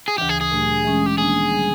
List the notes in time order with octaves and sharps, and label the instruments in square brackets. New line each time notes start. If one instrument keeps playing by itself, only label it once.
[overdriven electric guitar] G#4
[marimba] D2 C#3 E3 [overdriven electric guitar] G4
[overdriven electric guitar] G#4
G#4
[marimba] A#2 F#3 A3 D4 G4
E3 G#3 C#4
[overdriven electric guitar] G4
[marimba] D#3 G3 A#3 D4 [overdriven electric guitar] G#4
[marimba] D3 G3